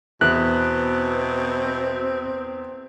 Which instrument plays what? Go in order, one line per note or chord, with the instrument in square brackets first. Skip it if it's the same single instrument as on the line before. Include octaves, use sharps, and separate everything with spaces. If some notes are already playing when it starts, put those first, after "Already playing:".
[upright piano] E2 [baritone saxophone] B2 [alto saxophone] C4 [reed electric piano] F#6